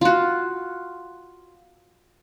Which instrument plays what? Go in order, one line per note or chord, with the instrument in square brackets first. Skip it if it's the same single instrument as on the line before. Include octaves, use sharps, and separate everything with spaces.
[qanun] F4 F#4